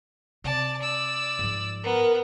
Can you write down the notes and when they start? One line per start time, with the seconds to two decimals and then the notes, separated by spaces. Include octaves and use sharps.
0.44 C3 D5 A5
0.81 D5 E6
1.39 G#2 F3
1.83 B3 A#4